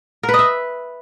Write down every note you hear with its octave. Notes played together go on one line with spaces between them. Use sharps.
A#4
B4
D#5
E5